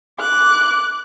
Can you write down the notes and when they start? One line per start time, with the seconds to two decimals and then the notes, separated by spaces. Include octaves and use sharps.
0.19 D6 F#6